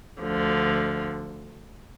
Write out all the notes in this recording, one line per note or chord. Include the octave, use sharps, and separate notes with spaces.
D2 D3 F3